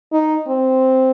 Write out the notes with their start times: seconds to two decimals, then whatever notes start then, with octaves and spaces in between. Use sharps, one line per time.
0.13 D#4
0.48 C4